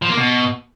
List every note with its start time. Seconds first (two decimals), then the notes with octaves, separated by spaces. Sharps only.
0.02 F3
0.10 A#3
0.18 B2